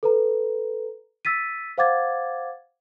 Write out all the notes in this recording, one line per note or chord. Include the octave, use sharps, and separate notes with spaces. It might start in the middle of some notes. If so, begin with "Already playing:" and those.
A4 B4 A#5
E6 A6 B6 D#7
C5 F5 F#5 D6 G#6 A6